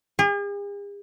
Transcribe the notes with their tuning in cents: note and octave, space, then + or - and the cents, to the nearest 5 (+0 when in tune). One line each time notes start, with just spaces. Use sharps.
G#4 -45